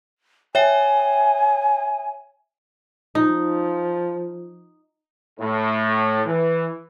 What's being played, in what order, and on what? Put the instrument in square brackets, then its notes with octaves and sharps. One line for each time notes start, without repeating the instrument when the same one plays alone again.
[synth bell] C#5 E5 G5 [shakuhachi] G#5
[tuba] F3 [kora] D#4
[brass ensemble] A2
E3